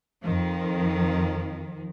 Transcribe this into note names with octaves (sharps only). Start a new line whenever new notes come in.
F2 D#3 F3